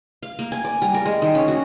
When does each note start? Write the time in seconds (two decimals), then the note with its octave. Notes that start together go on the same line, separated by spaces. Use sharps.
0.23 F5
0.39 A#3
0.52 G#5
0.64 D5
0.82 G3
0.94 A#4
1.05 G#3
1.22 D#3
1.35 C#4
1.48 F#4